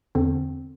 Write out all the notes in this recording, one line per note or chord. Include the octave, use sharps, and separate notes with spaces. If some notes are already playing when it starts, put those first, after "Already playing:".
E2 D3 C4